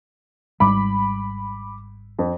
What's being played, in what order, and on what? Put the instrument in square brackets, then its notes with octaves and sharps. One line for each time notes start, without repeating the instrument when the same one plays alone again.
[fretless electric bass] G#1 G#2 G3 [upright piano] B5 D6
[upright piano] F2